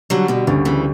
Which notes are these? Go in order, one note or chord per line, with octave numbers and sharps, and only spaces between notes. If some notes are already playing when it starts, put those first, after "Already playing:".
D3 F#3 G3
B2 D3
D2 C#3
C#3 E3